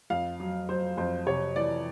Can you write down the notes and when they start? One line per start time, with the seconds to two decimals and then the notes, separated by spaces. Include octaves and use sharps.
0.10 F2 F5
0.40 F#3
0.69 F#3 C5
0.97 F2 C5
1.27 C3 C#5
1.56 E3 D5